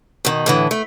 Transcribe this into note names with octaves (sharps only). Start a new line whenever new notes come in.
B2 D#3
A2 D3 E3
A3